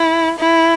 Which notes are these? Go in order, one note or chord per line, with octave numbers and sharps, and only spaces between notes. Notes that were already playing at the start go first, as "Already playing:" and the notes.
Already playing: E4
E4